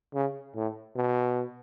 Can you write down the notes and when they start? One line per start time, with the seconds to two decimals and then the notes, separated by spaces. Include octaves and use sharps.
0.14 C#3
0.55 A2
0.96 B2